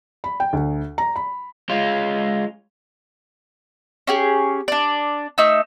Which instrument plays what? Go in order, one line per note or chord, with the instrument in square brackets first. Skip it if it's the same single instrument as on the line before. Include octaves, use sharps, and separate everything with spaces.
[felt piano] B5
G5
D2
A#5
B5
[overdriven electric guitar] G#3 F4
[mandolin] C#4 G4 G#4
D4 D5
A3 D#4 E6